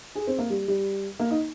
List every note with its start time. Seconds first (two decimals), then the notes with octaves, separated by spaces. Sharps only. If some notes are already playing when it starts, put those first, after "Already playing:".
0.15 G#4
0.27 C4
0.38 A#3
0.50 G3
0.68 G3
1.19 A#3
1.31 D#4